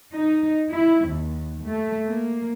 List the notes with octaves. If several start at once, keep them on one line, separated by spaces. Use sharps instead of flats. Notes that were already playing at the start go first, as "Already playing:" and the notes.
D#4
E4
D#2
A3
A#3